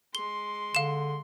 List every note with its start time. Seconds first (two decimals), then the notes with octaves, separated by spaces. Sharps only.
0.15 G#3 C6 G7
0.75 D3 F5 E7